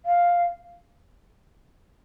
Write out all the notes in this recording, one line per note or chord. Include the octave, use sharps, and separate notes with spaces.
F5